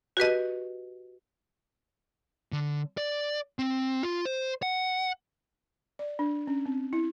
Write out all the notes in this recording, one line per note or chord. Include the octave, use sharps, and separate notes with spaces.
F#4 G4 B4 D#5
D3
D5
C4
F4
C5
F#5
D5
D4
C#4
C4
E4